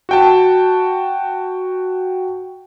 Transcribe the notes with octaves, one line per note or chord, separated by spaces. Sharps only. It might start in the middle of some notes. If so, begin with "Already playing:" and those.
F#4 G5 A5